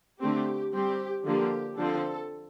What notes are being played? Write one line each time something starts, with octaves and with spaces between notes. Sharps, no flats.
D3 A3 C4 G4
G3 C4 G4
D3 F3 A#3 G4
D3 F3 C4 A4